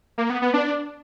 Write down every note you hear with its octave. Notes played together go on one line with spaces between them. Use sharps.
A#3
B3
B3
D4